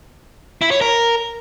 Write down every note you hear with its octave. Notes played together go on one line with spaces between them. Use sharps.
E4
C#5
A#4